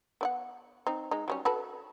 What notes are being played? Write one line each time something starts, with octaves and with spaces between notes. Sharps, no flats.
B3 D5 F#5
C4 D#4
G#3 D#4
F#3 G3 C#4
F#4 A4 B4